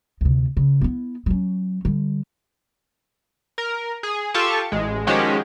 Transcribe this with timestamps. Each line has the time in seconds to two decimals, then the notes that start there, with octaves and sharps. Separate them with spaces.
0.21 D2 C3
0.57 C#3
0.81 B3 E4
1.26 F#3 C#4
1.85 D3 G3
3.58 A#4
4.03 G#4
4.34 F4 G4 A4 A5 C#6
4.72 A1 G#3
5.07 D#3 F3 G#3 C#4 F#4 G4